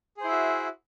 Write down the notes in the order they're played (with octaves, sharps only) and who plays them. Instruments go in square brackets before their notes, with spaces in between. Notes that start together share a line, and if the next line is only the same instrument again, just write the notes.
[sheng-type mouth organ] G#4
C5
E4
E5
F#4